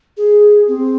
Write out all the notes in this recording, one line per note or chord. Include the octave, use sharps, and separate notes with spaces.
G#4
C4